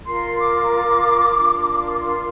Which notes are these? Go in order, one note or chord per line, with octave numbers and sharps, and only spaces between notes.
F4 A#4 C6
D6
D4 F4 A#4
D6
C6